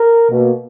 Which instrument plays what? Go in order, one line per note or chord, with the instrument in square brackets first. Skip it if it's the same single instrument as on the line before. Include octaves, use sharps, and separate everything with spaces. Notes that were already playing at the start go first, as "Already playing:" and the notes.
Already playing: [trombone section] A#4
B2 A#3